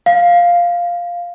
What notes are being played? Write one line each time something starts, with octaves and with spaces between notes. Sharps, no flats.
F5